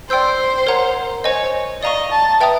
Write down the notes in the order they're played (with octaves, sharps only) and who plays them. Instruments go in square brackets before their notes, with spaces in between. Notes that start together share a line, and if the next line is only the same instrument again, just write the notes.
[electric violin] C5 [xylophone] D5 G5 C6 E6 G6
[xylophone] A#4 C#5 F#5 A#5
[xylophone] C5 D#5 G#5 [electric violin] C#5
[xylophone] D5 F5 A#5 C#6 [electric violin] D#5
[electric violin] A5
[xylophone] B4 E5 G5 A#5 D#6